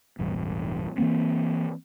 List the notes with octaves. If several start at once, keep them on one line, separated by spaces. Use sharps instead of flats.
E1 A1 G2
E3 F3 A#3 C4